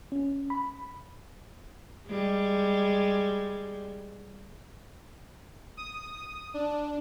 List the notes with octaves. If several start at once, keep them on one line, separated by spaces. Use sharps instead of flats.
C#4
B5
G3 G#3
D#6
D4